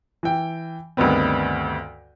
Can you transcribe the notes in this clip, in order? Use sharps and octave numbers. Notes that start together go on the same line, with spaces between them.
E3 G5
D2 G2 D#3 B3 C4